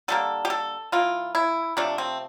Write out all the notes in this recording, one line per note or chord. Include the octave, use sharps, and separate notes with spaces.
D3 G3 A#3 A4
G4
A4
E3 A#3 F4
E4
C3 F3 A3 D4
C4